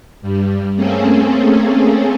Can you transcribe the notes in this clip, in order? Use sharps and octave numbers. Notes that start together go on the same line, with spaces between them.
G2 G3
A3 A#3 C4 C#4 G#4 A4